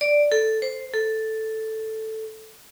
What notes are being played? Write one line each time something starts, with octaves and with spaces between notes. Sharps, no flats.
D5
A4
C5
A4